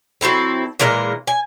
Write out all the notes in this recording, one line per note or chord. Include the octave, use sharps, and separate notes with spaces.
F#3 C4 E4 A4
A#2 E3 G#3 A#4
G#5